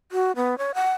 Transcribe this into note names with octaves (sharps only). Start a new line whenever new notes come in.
F#4
B3
C#5
F#5